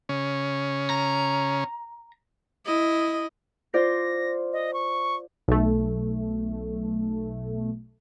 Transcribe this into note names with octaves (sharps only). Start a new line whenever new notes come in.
C#3 C#4
A#5
E4 D#5
F4 C5 D5 A#6
D#5
C#6
B1 A3